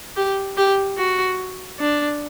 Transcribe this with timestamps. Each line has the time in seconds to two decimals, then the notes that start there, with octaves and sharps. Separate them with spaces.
0.16 G4
0.57 G4
0.98 F#4
1.80 D4